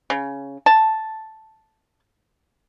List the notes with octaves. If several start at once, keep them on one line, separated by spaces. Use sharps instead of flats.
C#3
A5